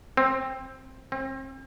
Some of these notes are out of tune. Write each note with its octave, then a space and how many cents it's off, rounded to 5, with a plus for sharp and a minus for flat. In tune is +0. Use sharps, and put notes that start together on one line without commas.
C4 +10
C4 +35